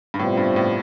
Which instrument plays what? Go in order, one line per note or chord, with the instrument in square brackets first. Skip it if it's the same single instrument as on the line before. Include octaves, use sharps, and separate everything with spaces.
[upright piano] G2
[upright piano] A2 [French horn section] C3 G3 B3 F4 C5
[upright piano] G2
A2